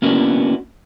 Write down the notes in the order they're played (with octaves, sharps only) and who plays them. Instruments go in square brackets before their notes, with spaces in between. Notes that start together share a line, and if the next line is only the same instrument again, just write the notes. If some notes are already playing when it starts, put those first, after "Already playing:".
[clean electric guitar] A#3 B3 C#4 D4 E4 F#4